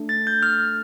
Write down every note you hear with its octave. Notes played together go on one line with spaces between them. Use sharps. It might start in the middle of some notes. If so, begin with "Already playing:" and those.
Already playing: A3 D4 A4
A6
G6
F6